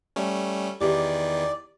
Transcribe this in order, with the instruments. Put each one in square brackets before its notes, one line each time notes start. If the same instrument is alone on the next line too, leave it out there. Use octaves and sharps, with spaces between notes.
[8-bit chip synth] G3 A3 C#4
[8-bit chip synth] E2 D#3 E3 [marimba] G4 [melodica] D5